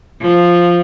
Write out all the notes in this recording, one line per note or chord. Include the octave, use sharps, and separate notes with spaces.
F3